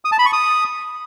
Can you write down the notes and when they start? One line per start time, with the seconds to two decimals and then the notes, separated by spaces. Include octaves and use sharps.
0.05 D#6
0.12 A5
0.19 B5
0.26 C#6
0.33 D#6